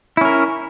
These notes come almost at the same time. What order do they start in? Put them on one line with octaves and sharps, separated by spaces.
E4 C#4 A#4